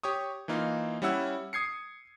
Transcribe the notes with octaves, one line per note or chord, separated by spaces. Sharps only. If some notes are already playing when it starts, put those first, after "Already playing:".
G4 C#5 C#6 D#6
E3 A#3 D#4 F4
G3 C#4 E4 F#5 E6
D#6 G#6 C7 C#7